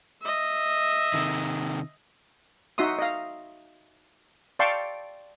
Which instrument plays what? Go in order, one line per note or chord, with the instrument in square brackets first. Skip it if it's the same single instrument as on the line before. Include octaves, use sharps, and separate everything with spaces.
[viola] D#5 E5
[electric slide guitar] C3 D#3
[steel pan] D#4 F#4 E5 C6 D#6
D#5 F5
D5 F5 G5 A5 C6 C#6